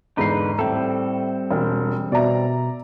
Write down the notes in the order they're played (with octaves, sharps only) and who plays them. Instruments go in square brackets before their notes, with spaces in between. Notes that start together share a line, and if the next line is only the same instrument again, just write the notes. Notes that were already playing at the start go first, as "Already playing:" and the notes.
[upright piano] E2 G#2 C7 [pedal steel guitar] D3 D#4 B4
[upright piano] A2 [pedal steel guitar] G3 C4 A4
[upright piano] E1
[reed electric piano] B2 [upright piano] D5 E5 A#5